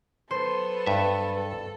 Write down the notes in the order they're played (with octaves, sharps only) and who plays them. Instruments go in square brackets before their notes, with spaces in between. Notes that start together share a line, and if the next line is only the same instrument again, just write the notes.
[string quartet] F#3 B3 A4 [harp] C5
[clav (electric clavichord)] G2 E5
[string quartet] A4